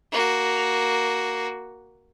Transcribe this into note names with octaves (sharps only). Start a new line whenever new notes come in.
A#3 F#4